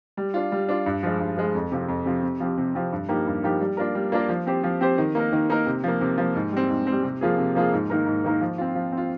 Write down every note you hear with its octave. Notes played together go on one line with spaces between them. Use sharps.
G3
D4 F4
G3
D4 F4
G2
F3 G#3
G2
F3 G#3
F2
C3 F3 C4
F2
C3 F3 C4
C3
F3 C4 G4
C3
F3 C4 G4
G2
F3 A#3 D#4 G4
G2
F3 A#3 D#4 G4
G3
A#3 D4 F4 A#4
G3
A#3 D4 F4 A#4
F3
C4 G4 C5
F3
C4 G4 C5
D#3
A#3 D#4 A#4
D#3
A#3 D#4 A#4
C3
F3 A#3
C3
F3 A#3
G#2
G3 C4
G#2
C4
G3
C3
F3 A#3 F4 G#4
C3
F3 A#3 F4 G#4
G#2
D#3 A#3 D#4 A#4
G#2
D#3 A#3 D#4 A#4
F3
C4 F4
F3
C4 F4